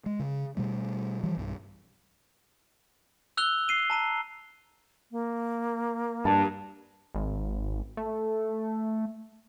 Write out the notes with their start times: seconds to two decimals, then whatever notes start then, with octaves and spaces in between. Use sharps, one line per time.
0.06 G#3
0.19 C#3
0.57 B2 G3 A3
1.23 E3 F3 G3
1.37 B1 G2
3.37 E6 F#6 F7 G7
3.68 C7 D#7 G7
3.90 A5 A#5 D#7
5.11 A#3
6.25 G2 A5
7.15 G#1
7.97 A3